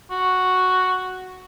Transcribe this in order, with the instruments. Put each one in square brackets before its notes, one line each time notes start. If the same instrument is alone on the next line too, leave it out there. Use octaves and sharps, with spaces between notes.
[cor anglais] F#4